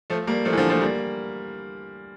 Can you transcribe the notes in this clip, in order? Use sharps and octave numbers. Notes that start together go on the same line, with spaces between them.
F3 A3
G3 A#3
F3 A3
E3
D3 F3
F3 A3
G3 A#3